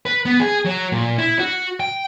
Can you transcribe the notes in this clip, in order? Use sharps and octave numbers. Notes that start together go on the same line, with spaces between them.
B4
B3
G#4
F#3
A#2
E4
F#4
G5